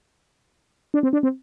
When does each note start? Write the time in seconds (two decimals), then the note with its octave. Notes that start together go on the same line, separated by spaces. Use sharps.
0.94 D4
1.03 C4
1.13 D4
1.23 C4